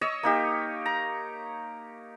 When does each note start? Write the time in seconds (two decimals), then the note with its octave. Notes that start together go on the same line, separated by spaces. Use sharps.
0.01 C#5 D#5 C#6 E6
0.23 A#3 D#4 G4
0.86 A#5